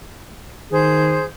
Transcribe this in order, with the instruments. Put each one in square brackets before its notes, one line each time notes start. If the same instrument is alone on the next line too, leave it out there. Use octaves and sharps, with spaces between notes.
[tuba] D#3 [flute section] G#4 C5 G6